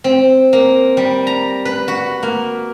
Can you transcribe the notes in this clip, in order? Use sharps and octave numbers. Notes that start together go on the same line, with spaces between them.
C4
A#3
G3
A#5
B4
F#4
A#3